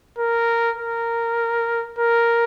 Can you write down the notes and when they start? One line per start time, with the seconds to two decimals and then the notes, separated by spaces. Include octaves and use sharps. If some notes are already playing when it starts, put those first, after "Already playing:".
0.18 A#4
0.78 A#4
1.98 A#4